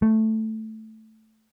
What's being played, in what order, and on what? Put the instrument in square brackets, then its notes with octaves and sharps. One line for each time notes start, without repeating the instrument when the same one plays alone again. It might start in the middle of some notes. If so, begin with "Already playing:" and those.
[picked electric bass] A3